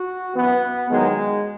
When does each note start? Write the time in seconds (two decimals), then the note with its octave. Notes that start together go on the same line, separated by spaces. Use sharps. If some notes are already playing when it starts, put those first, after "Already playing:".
Already playing: F#4
0.35 F#2 E3 B3
0.88 E2 D#3 F#3 G#3